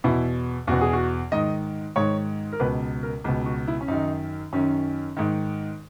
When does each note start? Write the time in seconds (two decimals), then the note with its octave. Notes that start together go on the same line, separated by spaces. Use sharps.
0.04 E2 B2 E4
0.67 E2 B2 F#4
0.81 G#4
0.93 F#4
1.32 G#2 D#3 D#5
1.96 G#2 D#3 C#5
2.53 A#4
2.60 C#2 B2 B4
3.03 A#4
3.24 C#2 B2
3.46 F#4
3.68 E4
3.81 C#4
3.88 F#2 D#3 D#4
4.53 F#2 D#3 C#4
5.17 G#2 D#3